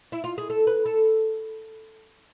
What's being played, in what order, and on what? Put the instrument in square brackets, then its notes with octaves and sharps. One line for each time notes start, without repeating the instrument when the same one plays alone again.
[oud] E4
F4
G#4
A4
B4
A4